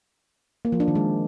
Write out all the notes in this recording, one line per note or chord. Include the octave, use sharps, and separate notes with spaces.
A#3
F3
D4
D#3
G#3